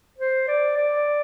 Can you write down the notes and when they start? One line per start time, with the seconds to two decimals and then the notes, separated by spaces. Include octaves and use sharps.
0.18 C5
0.48 D5
0.77 D5